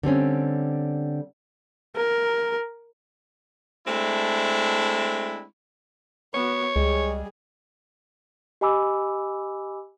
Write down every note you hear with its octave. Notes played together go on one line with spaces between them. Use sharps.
D3 G3 C4 C#4
A#4
G#3 A3 C4 D4 E4
B3 F#4 C#5
C#2 G3 G#3 G#4
G4 D#5 G#5 B5 D6 E6